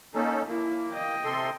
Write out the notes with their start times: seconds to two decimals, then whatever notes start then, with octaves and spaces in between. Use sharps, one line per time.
0.14 A#3 C#4 D#4 A4
0.47 A#3 E4
0.92 D#5 G5
1.25 C3 A4 C6